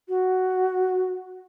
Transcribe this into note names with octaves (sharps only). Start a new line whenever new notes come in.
F#4